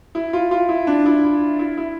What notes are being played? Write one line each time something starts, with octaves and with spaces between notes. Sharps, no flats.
E4
F4
F4
E4
D4
E4
E4
E4
E4